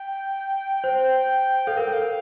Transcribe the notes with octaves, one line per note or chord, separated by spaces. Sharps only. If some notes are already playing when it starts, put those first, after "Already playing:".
Already playing: G5
C5
A4 F5
A#4 G5
A4 F5